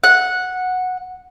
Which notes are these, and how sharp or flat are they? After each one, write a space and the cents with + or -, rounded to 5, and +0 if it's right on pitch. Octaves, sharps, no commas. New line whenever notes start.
F#5 -10